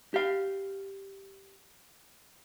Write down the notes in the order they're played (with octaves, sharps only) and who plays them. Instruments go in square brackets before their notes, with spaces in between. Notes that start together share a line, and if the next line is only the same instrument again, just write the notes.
[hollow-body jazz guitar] G4 F5